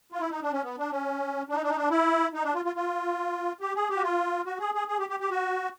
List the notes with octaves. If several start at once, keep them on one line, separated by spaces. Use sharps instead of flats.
F4
E4
D#4
D4
C#4
B3
D4
C#4
D4
D#4
D4
D#4
D4
E4
D#4
D4
F4
F4
F4
G4
G#4
G4
F#4
F4
F#4
G#4
G#4
G#4
G4
G4
G4
F#4